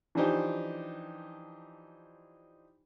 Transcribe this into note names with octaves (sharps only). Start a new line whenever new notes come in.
E3 F3 D4 D#4 G4 C5